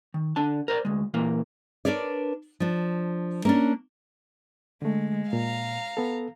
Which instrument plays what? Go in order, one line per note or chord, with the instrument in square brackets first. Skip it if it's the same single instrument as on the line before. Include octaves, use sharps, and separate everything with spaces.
[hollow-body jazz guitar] D#3
D3 D4 A5
A#4 C5 D5
D2 G#3
A#2 E3 A#3
[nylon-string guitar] D4 A#4 B4 C#5 D5
F3 D4
A#3 C#4 D4
[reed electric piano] D3 A3 [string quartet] G#3
[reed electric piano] A#2 [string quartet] F5 A#5
[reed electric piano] B3 A4